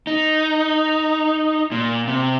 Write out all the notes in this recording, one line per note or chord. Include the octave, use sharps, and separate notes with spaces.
D#4
A#2
C3